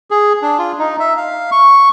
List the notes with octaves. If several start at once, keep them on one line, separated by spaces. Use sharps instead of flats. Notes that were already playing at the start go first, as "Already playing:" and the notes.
G#4
D4
F4
D#4
E5
F5
C#6